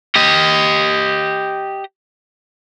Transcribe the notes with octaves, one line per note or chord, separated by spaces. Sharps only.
G4 D#5